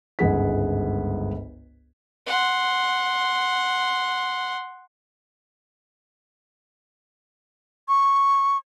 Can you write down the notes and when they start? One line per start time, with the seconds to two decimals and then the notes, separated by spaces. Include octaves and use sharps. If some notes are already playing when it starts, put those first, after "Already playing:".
0.19 G1 C#2 G#2 G#4 F#5 B6
2.26 F#5 C6
7.88 C#6